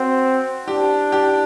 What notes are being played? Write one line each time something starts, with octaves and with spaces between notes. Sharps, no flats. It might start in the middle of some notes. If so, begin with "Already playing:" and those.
Already playing: C4 F#4
D4 G4
G4